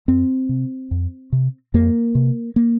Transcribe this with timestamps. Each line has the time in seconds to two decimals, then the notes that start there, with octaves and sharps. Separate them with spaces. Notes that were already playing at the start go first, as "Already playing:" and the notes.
0.08 F2 C4
0.49 C3
0.91 F2
1.32 C3
1.74 F2 A#3
2.15 C3
2.56 A#3